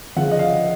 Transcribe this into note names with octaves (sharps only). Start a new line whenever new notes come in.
C#3 F3 F#5
D#5
F5